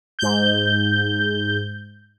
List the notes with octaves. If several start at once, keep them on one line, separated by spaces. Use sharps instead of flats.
G#2 G6